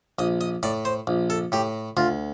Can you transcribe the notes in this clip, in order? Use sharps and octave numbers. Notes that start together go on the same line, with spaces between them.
A#1 D#5
D#5
A2 D5
C5
A#1
A4
A2 G4
D2 F4